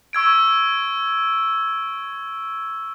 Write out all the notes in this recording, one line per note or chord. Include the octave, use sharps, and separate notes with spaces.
C#6 E6 G#6 D7